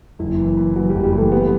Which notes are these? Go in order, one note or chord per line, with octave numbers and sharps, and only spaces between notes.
F#1 E4
E3
E3
E3 F#3 F#4
G3 G4
F#1
G3 G4
E3 A3 A4
G3 B3 G4